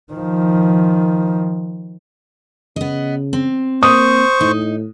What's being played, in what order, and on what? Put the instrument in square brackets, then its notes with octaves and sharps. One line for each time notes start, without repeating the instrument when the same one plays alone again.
[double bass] D#3 F3
[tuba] C#3 [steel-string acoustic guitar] B3 D#5
[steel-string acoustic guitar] C4
[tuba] A#3 [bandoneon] C5 C#6 [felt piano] D#6
[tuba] A2 [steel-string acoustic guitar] D#4